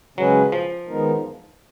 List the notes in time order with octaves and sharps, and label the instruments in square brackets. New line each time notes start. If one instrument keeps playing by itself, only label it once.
[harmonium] C#3 G#3 C#4 G#4 B4 [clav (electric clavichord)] F#3
[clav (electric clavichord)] F3
[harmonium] D#3 G#3 B3 D#4 A#4